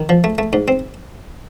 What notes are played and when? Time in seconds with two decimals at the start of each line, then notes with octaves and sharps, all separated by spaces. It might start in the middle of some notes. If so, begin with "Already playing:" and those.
Already playing: D#3
0.09 F3
0.24 A3
0.38 A3
0.53 G#2
0.68 C4